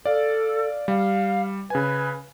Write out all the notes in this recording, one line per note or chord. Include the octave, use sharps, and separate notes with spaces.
A4 D5 F5
G3 F5
C#3 B4 G#5